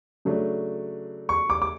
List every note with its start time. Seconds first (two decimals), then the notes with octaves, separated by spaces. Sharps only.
0.25 C#3 F#3 A3 D4
1.29 C#6
1.50 D6
1.62 D6